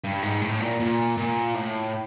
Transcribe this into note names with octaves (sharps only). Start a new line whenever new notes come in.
G2
G#2
A2
A#2
A#2
A#2
A2